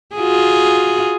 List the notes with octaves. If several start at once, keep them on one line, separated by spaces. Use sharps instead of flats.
F4 F#4 G#4